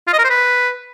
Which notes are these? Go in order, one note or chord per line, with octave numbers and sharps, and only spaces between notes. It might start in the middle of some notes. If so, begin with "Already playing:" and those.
F4
D#5
A#4
C5
B4